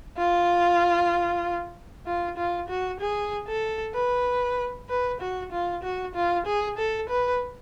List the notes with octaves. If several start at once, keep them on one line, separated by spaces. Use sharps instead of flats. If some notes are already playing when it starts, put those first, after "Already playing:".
F4
F4
F4
F#4
G#4
A4
B4
B4
F#4
F4
F#4
F4
G#4
A4
B4